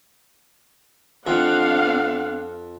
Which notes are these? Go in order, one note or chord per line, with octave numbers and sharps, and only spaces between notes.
F2 C4 D4 F5 F#5